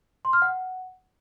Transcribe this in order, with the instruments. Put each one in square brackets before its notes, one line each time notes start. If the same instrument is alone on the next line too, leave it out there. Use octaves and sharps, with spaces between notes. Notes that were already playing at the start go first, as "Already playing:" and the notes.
[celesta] C6
F6
F#5